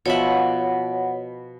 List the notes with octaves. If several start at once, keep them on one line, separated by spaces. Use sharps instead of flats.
B2 F3 C#5 E5 F#5